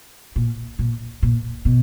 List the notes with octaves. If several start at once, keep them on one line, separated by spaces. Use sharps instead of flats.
A#2
A#2
A#2
B2